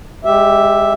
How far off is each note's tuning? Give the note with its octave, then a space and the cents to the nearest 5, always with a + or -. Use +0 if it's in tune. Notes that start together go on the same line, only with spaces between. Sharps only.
G#3 -25 G4 +0 E5 +0